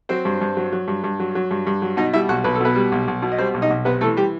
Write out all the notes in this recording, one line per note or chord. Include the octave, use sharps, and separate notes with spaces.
F#3 C4 C5
G2
G2
F#3
F#3
G2
G2
F#3
F#3
G2
G2
F#3
B2 D#4 D#5
G3 E4 E5
B1 F#4 F#5
B1 B4
A4
B2 B3 B4
G3
B1
B1
B2
D#5
G3 C4 C5
B1
D#4 D#5
B1
C3 B3 B4
E3 A3 A4
G3 G4